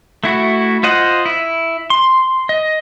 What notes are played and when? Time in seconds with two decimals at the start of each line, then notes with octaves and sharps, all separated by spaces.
0.24 A3 E4 F#4
0.83 F4 C5 D#5 F#5
1.26 E4
1.90 C6
2.49 D#5